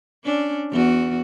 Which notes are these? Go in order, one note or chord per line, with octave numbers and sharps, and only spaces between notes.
C#4 D4
E2 F#4